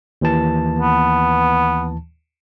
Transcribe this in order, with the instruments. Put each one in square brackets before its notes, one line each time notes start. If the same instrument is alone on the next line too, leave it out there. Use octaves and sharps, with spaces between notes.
[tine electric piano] D#2 E3 A5
[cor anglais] B3